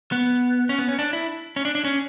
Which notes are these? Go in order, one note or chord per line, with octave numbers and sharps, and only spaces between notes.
B3
C#4
B3
C#4
D4
E4
C#4
D4
D4
C#4